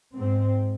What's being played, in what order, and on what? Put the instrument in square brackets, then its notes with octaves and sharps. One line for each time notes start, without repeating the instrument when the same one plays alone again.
[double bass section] G#2 C4